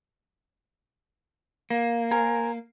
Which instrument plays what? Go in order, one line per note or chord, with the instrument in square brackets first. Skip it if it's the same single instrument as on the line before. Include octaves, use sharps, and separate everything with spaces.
[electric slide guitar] A#3
[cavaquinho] A#4 C5 G#5